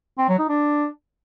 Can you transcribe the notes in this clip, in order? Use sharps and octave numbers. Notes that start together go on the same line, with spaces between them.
C4
F#3
D#4
D4